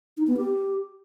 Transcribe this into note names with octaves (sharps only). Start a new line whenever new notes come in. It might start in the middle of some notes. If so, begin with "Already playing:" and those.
D#4
B3
G4